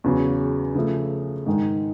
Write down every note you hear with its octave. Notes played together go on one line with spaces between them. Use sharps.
E2 C#3 F#3
C#3 F3 A3
G#2 D#3 G#3